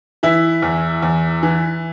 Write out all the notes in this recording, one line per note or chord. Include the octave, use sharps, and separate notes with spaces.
E3 E4
E2
E2
E3